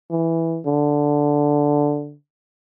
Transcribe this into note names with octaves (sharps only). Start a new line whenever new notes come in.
E3
D3